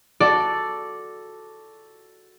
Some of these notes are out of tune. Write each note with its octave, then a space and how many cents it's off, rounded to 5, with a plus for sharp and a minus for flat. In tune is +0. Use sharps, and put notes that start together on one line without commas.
F#4 +0 A4 +0 D5 +0